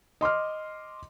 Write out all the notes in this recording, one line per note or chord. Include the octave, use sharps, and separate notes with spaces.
D#5 C6 D6 F6